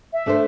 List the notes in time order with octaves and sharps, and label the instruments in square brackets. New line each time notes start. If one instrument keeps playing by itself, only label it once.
[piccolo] E5
[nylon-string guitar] A3 D4 A4 C5